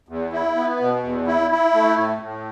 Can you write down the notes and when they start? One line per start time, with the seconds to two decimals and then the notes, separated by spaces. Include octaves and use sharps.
0.08 E2
0.32 E4
0.56 B3
0.80 B2
1.03 E2
1.27 E4
1.51 E4
1.74 A3
1.98 A2
2.21 A2